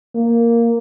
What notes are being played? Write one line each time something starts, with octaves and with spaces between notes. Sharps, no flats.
A#3